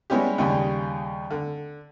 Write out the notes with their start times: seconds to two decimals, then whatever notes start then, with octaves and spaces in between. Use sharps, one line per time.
0.10 G3 G#3 B3 C#4 E4 G4
0.38 D#2 C#3 G3
1.31 D3